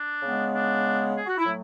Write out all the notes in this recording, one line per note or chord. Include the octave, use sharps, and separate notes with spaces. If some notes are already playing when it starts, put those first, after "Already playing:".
Already playing: D4
C#3 G#3 B3
D4
G#4
F#4
E4
A2 F#3 A3